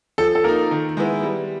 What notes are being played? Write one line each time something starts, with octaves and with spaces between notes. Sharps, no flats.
F3 A4
A4
A#3 D#4 A#4
D#3
G#3 B3 E4
G3